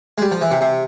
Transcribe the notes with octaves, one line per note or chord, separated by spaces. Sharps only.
G#3
G3
F3
E3
C3
C3